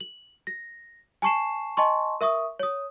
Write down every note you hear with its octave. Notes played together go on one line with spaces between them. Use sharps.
F#7
A#6
G#5 A5 C#6 C7 E7
D#5 G#5 A5 C6 C#6
A#4 E5 C#6 D#6
C#5 D#6